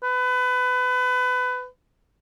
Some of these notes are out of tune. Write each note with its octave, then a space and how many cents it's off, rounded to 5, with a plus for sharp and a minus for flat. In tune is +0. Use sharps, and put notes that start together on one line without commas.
B4 +25